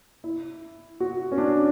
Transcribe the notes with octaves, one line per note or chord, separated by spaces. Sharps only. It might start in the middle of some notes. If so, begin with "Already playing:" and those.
E4
F#4
C#4
D4